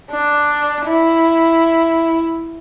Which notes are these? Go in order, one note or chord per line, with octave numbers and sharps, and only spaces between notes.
D4
E4